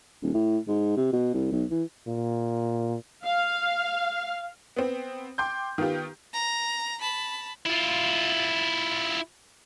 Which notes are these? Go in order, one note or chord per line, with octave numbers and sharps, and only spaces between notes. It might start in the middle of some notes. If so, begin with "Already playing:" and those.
D#1
A2
G#2
C3
B2
C2
B1
E3
A#2
F5
B3 C4
G5 C6 D6 G6
D#3 B3 F4 G4
A#5
A5 B5
E4 F4